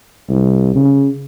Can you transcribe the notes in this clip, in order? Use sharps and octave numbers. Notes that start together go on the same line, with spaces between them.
C2
C#3